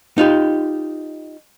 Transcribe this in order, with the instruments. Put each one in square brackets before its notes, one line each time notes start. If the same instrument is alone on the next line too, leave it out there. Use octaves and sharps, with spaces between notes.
[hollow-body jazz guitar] D#4 F4 G4